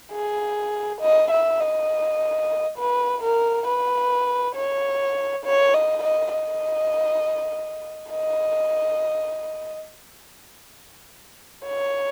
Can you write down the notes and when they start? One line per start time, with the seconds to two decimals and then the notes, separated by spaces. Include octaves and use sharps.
0.12 G#4
1.01 D#5
1.31 E5
1.60 D#5
2.78 B4
3.23 A#4
3.68 B4
4.55 C#5
5.45 C#5
5.74 D#5
6.03 D#5
6.34 D#5
8.11 D#5
11.66 C#5